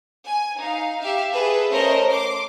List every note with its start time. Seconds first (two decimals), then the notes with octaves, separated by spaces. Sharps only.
0.24 G#5
0.58 D#4 F5
1.00 G4 E5 F5
1.31 G#4 A4 B4 E5
1.71 A3 C#4 A#4 C5 D#5
2.10 C6 D6